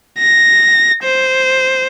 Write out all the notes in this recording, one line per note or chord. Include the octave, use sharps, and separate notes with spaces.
A#6
C5